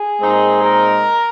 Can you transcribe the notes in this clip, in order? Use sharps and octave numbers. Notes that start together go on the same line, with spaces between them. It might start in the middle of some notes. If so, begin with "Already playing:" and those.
Already playing: G#4
A#2 G#3 C4 D#4
A#4